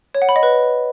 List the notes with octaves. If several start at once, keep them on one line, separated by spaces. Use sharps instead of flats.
C#5
F#5
B5
D#5
B4